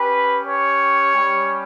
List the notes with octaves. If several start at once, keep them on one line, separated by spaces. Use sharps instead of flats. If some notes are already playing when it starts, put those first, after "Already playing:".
Already playing: C#4 G4 B4
C#5
G3 C#4 G4